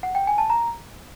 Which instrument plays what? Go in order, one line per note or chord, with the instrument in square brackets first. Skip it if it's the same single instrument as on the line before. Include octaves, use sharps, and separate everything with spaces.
[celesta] F#5
G5
G#5
A5
A#5